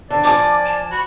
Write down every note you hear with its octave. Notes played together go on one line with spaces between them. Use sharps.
D3 D5
F3 G#5 D6
A5
F#4 B5